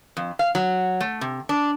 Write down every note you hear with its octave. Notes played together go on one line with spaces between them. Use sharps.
F2
F5
F#3
A3
C3
D4